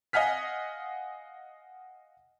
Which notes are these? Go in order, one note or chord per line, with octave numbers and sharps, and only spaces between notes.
D#5 F5 F#5 G#5 F6 B6